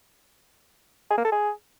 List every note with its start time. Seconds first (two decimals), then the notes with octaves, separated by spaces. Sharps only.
1.11 G#4
1.18 A#3
1.25 A4
1.32 G#4